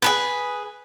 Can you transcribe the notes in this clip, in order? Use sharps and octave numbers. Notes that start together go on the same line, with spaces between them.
G#4 A4 B4